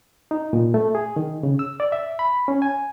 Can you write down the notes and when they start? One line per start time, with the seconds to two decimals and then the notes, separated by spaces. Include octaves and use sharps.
0.31 D#4
0.53 A#2
0.74 A3
0.95 G#4
1.16 D#3
1.43 C#3
1.59 E6
1.80 D5
1.92 E5
2.19 B5
2.48 C#4
2.62 G#5